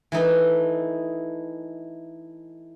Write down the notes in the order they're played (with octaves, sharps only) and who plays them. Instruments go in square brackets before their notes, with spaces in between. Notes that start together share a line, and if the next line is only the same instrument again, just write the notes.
[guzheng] E3 A3 D#4